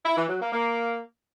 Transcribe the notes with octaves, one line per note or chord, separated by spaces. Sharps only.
E4
E3
F#3
A#3
A#3